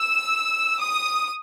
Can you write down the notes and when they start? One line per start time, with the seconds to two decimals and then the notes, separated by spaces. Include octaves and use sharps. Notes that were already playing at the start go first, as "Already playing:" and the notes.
Already playing: E6
0.79 D#6